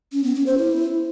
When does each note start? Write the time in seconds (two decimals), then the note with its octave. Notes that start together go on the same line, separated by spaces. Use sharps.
0.13 C#4
0.24 B3
0.35 C#4
0.46 C5
0.58 E4